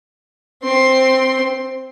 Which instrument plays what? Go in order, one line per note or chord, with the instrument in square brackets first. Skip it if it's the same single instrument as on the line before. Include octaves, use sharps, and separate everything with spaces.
[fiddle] C4 C6